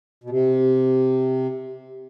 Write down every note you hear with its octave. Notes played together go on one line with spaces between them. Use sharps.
B2
C3